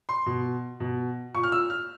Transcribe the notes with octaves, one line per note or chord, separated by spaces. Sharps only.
C6
B2
B2
A#2 C#6
F6
E6
F6